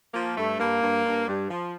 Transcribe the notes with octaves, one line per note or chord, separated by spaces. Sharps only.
F3 A#3
G2 A3
G2 A#3
G2
G2
G2
F3